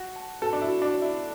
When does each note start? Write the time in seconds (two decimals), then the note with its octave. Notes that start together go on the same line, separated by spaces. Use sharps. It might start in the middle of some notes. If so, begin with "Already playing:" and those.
Already playing: F#4 F#5
0.16 A5
0.42 F#4 A4
0.53 D4
0.62 E4
0.68 F#4
0.82 D4
0.94 D5
1.02 E4